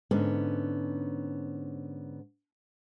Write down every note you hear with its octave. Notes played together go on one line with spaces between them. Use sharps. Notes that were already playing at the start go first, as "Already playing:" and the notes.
G#2 D3 B3 C#4